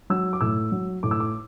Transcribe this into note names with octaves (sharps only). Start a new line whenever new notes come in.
F#3 E6
D6
A2 E6
F#3
A2 D6
E6
D6